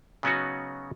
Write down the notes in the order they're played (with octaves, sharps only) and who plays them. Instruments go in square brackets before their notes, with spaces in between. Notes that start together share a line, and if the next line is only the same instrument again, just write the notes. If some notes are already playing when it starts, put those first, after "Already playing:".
[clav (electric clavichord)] C#3 F#3 B3 C#4 D#4 F#4